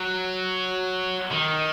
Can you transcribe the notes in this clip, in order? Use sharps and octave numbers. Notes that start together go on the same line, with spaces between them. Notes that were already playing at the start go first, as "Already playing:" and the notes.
Already playing: F#3
D#3